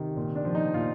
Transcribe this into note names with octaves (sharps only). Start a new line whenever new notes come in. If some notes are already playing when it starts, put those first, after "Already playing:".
Already playing: C3 D#3
A#2
D4
F3
D#4
A#2 F4